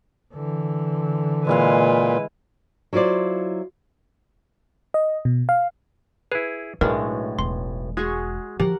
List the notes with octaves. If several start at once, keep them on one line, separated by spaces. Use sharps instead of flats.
D3 E3
A#2 G#3 E4 B4 F5
F#3 E4 F4 C5 D5
D#5
B2
F5
E4 G#4 B4
B1 A2 G#3 A3 D4 E4 A#4
E1 C6
G#3 F#4 G#4 C#6
F3 G4 A#4 F#5